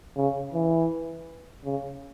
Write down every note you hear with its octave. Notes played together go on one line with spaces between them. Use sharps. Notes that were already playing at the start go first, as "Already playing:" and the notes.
C#3
E3
C#3